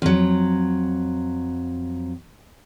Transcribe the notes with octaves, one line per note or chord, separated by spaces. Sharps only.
F2 F#3